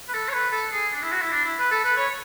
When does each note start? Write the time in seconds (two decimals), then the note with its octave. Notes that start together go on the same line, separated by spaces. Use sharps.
0.08 B4
0.14 A4
0.28 C#5
0.33 B4
0.52 A4
0.72 G#4
0.92 D4
1.02 E4
1.12 F#4
1.22 E4
1.31 D4
1.44 E4
1.59 B4
1.71 A4
1.84 B4
1.97 C#5